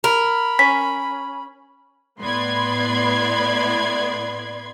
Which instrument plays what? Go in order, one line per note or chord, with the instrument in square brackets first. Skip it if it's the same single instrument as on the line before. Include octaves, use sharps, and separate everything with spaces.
[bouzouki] A#4 [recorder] B5
[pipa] C#4 [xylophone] B6
[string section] A2 B3 D5 B5 C6 G#6